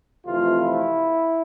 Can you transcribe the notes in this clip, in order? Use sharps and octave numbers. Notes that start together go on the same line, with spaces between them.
F2 C3 E3 A3 F4
E4